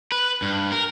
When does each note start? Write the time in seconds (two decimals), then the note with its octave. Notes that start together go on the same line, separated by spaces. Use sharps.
0.12 B4
0.42 G2
0.72 A#4